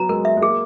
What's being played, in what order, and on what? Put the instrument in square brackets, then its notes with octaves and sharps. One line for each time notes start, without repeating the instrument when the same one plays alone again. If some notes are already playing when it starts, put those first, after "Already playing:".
Already playing: [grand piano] F#3 B3 [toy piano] A#5
[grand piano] G#3 [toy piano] A#4
[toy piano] E5
[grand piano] G#3
[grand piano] A#3 [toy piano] G#4